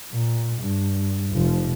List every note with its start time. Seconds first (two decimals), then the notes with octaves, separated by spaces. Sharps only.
0.11 A#2
0.61 G2
1.32 F1 F3